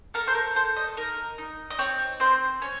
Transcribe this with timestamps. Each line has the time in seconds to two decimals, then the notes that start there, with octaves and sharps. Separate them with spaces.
0.14 A4 A#4
0.27 C5
0.35 A#4
0.55 A4 C5
0.76 D#5
0.97 D#4 A#4
1.38 D#4
1.70 D#5
1.79 C4 C#5
2.20 C4 C5
2.61 C#4 C#5